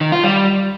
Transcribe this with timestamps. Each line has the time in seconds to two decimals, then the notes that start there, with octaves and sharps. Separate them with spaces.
0.01 D#3
0.12 F4
0.24 G3